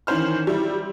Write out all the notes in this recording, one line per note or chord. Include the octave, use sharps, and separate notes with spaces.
D#3 E3 C#4 C5 F6
G3 E4